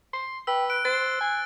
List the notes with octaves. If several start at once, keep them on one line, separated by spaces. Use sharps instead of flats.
C6
B4 G5 E6
F#6 D7
C5 A6
G#5